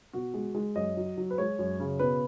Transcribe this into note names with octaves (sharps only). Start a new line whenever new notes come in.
B2 F#4
G#3
G#3
F#2 D#5
F#3
F#3
B4
G#3 C#5
F#2
C#3
B2 B4